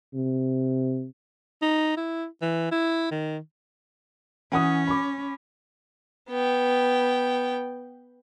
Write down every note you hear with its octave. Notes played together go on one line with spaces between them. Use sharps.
C3
D#4
E4
E3
E4
D#3
E3 C#4 F#5 D#6
B5 D6
B3 G5